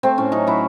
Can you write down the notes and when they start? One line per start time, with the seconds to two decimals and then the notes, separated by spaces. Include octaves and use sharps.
0.03 A3 C4
0.18 A2 C#4
0.32 F#3 D#4
0.47 F#3 E4